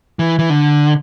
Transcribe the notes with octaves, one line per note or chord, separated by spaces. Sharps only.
E3
E3
D3